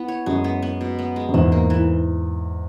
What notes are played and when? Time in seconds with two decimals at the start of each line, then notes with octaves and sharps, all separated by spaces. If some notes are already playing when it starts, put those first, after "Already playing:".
Already playing: B3 E4
0.08 C#5
0.26 F#2 G#3
0.44 B3
0.62 B3
0.81 B2
0.99 B3
1.16 G#3
1.29 F#2
1.34 E2 G#2 E3
1.52 A#3
1.70 E3